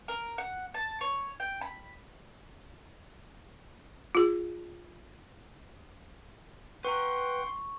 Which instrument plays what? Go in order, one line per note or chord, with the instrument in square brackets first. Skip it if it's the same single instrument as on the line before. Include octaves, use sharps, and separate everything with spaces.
[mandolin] A#4
F#5
A5
C#5
G5
B5
[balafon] F4 G#4
[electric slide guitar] B4 A#5 [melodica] F#5 G5 [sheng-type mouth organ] C6 [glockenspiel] C#6